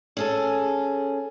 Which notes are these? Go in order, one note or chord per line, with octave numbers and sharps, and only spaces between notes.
C#4 G#4 A4